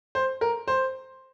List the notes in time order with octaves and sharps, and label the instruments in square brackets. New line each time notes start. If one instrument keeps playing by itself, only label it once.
[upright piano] C5
A#4
C5